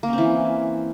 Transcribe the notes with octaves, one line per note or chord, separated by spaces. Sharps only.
E3 A#3 C4 C#4